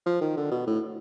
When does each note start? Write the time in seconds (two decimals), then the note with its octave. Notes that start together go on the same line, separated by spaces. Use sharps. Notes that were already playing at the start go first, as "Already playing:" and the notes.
0.06 F3
0.21 D#3
0.37 D3
0.52 B2
0.67 A2